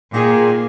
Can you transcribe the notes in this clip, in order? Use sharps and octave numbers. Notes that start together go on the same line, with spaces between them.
A#2 D#3 A#3 G#4